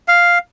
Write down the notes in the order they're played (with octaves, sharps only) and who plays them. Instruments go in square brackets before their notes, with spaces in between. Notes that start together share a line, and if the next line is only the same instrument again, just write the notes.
[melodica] F5